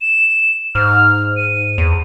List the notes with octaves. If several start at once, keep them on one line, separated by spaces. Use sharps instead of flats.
E7
G#2 F6
D#7
E2